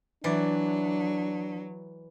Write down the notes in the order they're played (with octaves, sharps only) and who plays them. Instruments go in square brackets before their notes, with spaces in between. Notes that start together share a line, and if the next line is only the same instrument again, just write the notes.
[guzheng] E3 D5 [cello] F#3 [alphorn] D4